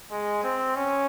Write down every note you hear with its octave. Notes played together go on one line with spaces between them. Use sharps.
G#3
C4
C#4